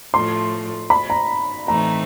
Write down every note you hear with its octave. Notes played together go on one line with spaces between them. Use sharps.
A2 F3 A3 C6
B5
A#5
A2 E3 A3 C4 D#4 A#5